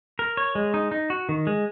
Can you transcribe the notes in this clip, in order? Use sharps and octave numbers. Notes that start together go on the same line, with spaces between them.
A#4
C#5
G#3
D#4
D#4
F#4
D#3
G#3